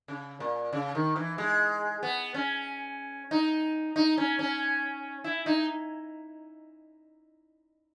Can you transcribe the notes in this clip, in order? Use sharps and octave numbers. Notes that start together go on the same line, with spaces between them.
C#3
A#2
C#3
D#3
E3
G#3
B3
C#4
D#4
D#4
C#4
C#4
E4
D#4